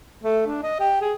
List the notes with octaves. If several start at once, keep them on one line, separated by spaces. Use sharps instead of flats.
A3
D4
D#5
G4
G#4